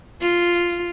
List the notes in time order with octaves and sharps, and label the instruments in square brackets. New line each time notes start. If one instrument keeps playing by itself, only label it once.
[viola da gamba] F4